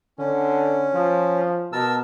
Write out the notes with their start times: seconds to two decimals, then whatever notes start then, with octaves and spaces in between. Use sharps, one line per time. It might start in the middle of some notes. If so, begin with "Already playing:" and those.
0.18 D3 C#4
0.94 F3
1.73 B2 A#4 A5 E6